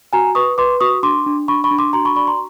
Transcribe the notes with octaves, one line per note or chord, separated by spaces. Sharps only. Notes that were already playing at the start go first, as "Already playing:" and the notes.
F#4 G#5 A#5
B4 C#6 D#6
B4 C6 D6
F#4 C#6 D#6
D4 C6 D6
D4
D4 B5 C#6
B5 C#6
D4
C6 D6
F#4 A#5 C6
B5 C#6
D5 B5 C#6
A#5 C6